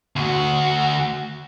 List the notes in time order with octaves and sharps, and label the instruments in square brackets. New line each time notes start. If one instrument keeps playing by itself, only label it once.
[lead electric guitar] D2 F#4